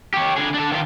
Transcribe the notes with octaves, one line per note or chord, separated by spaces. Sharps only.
G4 C#5
D3 G#4
D4 A4
D#3 F4